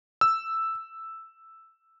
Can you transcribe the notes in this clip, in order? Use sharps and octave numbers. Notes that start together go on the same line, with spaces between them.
E6